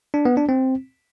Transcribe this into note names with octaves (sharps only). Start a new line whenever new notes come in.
D4
B3
D4
C4